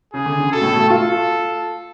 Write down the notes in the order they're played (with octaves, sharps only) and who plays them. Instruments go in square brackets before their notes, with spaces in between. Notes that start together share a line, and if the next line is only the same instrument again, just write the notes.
[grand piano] C#3 [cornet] G#4
[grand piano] D3
C#3
[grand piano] B2 [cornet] A4
[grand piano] A2
B2
A3
[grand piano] F4 [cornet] A4